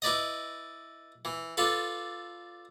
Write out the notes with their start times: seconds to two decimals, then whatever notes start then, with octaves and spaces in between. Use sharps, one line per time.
0.02 E4 B4 D5 D#5
1.25 E3
1.57 D4 F4 A4 B4